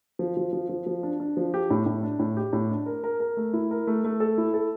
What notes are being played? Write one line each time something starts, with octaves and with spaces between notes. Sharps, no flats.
F3
F3
F3
F3
F3
D4
D4
F3
G4
A2
A2
D4
A2
G4
A2
D4
A#4
A#4
A#4
A3
E4
A#4
A3
A3
A4
E4
A4